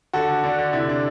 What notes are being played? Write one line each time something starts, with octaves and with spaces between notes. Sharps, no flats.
D3 F#4 A4
D3
D3 D4
D3
C3 E4
D4